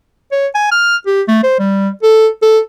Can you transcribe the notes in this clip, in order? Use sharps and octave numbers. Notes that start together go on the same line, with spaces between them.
C#5
G#5
F6
G4
A3
C5
G3
A4
A4